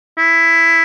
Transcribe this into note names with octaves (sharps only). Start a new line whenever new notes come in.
E4